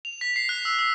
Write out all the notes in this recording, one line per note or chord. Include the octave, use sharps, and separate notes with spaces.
F7
B6
C7
F#6
E6
E6